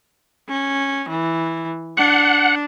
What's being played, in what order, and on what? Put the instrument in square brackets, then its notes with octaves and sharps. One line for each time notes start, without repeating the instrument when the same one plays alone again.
[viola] C#4
E3
[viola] D4 [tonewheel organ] F#5